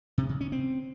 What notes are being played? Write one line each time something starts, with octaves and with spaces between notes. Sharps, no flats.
C3
C#3
C#4
C4